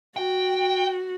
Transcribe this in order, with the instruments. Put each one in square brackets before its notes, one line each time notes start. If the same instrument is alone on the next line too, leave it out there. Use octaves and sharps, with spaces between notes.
[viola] F#4 [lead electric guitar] G5